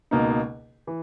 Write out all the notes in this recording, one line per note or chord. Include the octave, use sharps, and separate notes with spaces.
C#2 B2 A#3 D#4
E3